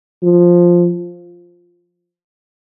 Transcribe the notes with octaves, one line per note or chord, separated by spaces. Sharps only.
F3